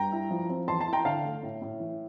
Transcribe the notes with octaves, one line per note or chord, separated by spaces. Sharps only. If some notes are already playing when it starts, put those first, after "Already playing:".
Already playing: G2 G5 A#5
E4
F3
C4
E2 A5 C6
A5 C6
E4
G5 A#5
D3 F5 A5
A3
A2
A2
E3